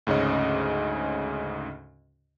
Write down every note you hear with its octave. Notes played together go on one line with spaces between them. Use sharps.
D2 G#2 C#3 C#4 D#5